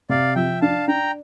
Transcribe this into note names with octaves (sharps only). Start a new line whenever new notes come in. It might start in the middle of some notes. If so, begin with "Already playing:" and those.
C3 D5 F5
F3 E5 G5
D4 F5 A5
D4 G5 A#5